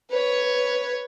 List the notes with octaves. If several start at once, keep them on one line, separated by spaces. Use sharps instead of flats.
B4 C#5